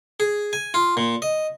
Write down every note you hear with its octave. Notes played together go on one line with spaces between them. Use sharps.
G#4
G#5
F4
A#2
D#5